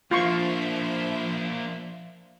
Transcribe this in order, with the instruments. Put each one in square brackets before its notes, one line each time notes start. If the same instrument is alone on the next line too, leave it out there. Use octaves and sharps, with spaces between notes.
[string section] F3 C5 E5 [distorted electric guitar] A#3 D4 [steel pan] F4 C6 C#6